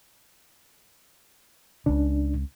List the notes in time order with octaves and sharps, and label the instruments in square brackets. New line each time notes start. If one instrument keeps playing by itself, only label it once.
[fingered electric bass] C#2 C#3 [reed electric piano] D4